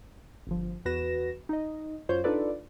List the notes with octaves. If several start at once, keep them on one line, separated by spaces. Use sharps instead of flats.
G1 F3
E2 F#4 B4 A#6 E7
D#4 D#5
F#2 F4 C5 C#5 G6
D4 D#4 F4 A4 B4 D5